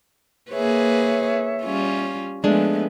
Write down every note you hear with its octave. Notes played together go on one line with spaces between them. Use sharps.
A#3 G#4 B4 C#5 E5
G3 C#4 F4
F3 G#3 A3 B3 D4 G#5